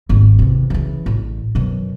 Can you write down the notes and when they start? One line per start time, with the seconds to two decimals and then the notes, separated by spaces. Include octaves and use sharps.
0.09 G#1 D#2
0.39 E2 C3
0.70 C#3 E3
1.06 A1
1.55 F#2 B2